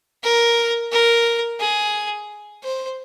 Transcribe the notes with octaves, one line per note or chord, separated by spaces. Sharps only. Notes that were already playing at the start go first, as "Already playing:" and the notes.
A#4
A#4
G#4
C5